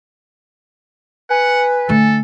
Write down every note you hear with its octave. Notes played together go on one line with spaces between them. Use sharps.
B4 F#5 G#5
D3 A3 A4